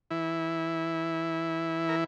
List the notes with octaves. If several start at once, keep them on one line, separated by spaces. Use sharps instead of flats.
E3 E4
A#4